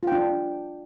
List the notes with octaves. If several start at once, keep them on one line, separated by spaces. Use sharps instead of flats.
D4 F4 G5